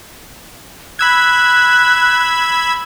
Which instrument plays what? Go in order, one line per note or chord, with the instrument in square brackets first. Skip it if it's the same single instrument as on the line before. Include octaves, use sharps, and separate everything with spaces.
[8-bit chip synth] B5 E6 G#6 [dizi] F#6